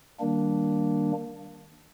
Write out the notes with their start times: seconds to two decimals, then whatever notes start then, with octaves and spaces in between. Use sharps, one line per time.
0.19 D#3 G3 A#3 D4